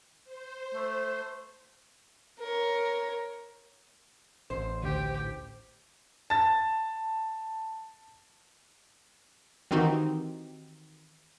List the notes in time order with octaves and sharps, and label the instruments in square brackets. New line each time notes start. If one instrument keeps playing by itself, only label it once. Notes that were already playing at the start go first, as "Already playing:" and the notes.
[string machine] C5
[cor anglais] A3
[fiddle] A#4 C#5
[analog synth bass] A1 [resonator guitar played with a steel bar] C5
[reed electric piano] D2 [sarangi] G4
[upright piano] A5 A6
[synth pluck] D#3 E3 C4 D#4 F#4 G4